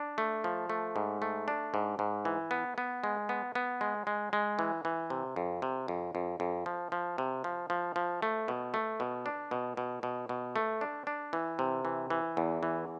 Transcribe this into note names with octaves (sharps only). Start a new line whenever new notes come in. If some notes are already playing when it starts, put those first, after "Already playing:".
Already playing: D4
A3
F3
A3
G#2
A3
D4
G#2
G#2
E3
B3
B3
G#3
B3
B3
G#3
G#3
G#3
E3
E3
C3
F2
C3
F2
F2
F2
F3
F3
C3
F3
F3
F3
A3
B2
A3
B2
D4
B2
B2
B2
B2
A3
D4
D4
E3
C3
E3
E3
E2
E3